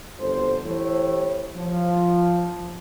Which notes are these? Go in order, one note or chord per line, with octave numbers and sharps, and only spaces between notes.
G1 F2 F#3 A4 C5
E3 A3 E4 G4 C5 C#5
F3